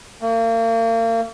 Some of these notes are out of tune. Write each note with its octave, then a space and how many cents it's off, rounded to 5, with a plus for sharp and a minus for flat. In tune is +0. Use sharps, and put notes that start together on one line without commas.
A#3 -35